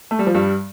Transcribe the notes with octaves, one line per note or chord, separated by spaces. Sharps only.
A3
G3
F3
G2 G3